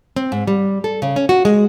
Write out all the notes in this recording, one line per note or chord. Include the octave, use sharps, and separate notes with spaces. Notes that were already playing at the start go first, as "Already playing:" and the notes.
C4
G#2
G3
A4
C#3
C#4
F#4
G#3